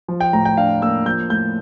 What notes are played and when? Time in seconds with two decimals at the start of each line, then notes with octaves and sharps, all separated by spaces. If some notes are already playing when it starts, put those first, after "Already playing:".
0.08 F3
0.20 G5
0.33 A2 A#5
0.45 G5
0.57 D4 F5
0.82 A#3 E6
1.06 F3 G6
1.30 A2 G6